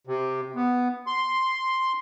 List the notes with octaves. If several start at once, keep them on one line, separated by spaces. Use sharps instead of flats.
C3
B3
C6